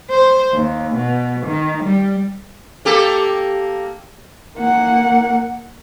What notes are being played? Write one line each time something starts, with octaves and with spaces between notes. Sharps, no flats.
C5
D#2
B2
D#3
G3
A#3 G4 A4
A#3 F#5